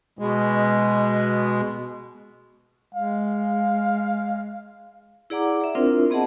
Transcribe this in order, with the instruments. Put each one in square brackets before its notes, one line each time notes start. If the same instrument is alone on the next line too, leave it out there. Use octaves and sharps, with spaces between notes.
[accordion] B2 G#3
[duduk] G#3 [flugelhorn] F5
[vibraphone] E4 G#4 D5 F#5 A#5 D6
D5 E5
C4 D4 E4 F4 A#4 C5
B3 C4 G#4 D#5 F#5 A5